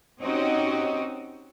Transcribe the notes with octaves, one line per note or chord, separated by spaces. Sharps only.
C4 C#4 D#4 F#4 G4 D#5